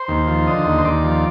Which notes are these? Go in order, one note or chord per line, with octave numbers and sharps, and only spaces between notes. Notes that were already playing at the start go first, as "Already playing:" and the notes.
Already playing: C5
D#2
F3
D3 D#5
D#2
C5
D#2 D5
F3